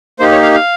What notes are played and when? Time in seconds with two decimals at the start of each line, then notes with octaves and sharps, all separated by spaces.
0.19 A#3 D#4 G4 C5
0.32 C#5
0.43 F5
0.54 F5